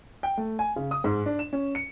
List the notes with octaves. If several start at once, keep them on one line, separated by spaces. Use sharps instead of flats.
G5
A3
G#5
C#3
D#6
G#2
D4
E7
C#4
C#7